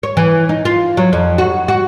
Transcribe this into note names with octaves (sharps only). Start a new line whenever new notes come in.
C#5
E3
D#4
F4
F#3
F2
F#4
F#4